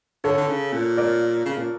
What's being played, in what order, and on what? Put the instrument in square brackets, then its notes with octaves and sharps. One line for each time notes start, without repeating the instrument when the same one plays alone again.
[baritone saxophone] D3 [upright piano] A4 C#5
[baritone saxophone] D3
C#3
A#2
[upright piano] A#4 D5
[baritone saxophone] C#3
A#2